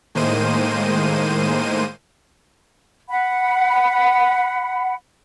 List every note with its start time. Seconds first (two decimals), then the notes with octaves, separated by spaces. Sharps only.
0.15 A2 D#3 G#3 A#3 C5 D#7
3.09 F#5 B5